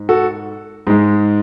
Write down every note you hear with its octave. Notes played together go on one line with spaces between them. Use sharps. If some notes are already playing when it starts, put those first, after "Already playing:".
Already playing: G#2
F#4 A4
G#2 G#3